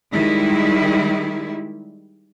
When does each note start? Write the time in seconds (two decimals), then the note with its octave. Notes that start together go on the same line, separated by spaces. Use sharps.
0.12 D#3 G3 G#3 E4